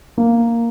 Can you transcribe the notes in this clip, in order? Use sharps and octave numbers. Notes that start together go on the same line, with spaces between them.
A#3